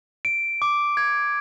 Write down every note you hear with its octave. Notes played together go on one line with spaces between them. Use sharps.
D7
D6
G#6